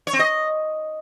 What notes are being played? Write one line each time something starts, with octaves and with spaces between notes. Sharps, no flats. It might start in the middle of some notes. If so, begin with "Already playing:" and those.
C#5
C4
D#5